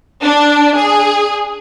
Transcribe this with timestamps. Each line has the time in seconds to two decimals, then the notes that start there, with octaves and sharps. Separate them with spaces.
0.23 D4
0.76 G#4